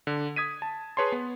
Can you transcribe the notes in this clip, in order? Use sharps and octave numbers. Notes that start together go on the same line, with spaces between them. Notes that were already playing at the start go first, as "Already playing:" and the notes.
D3
D#6 G#6 B6 D#7
A5
G#4 B4 C#5 A5 C6
B3